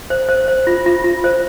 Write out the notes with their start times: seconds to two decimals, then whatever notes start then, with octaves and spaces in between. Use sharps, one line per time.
0.10 C5
0.29 C5
0.48 C5
0.67 F4
0.86 F4
1.04 F4
1.24 C5